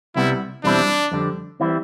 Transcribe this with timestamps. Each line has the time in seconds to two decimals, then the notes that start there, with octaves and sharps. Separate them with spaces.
0.16 C2 C3 G3 B3 E4
0.64 E2 B2 G3 C4 D4 E4
1.12 F2 D3 G3
1.60 E3 G3 C4 E4